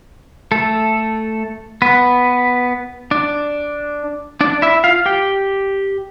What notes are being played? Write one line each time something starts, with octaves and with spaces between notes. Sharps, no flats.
A3 A4
B3 B4
D4 D5
D4 D5
E4 E5
F4 F5
G4 G5